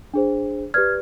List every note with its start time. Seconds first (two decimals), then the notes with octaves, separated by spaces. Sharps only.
0.14 D4 G#4 C5
0.74 G4 B4 D5 F6 G#6